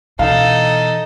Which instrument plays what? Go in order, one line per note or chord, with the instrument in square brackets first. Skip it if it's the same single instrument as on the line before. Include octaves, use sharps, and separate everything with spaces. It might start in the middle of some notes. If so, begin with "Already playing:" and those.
[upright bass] B2 E3 [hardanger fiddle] D#4 A4 [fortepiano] F5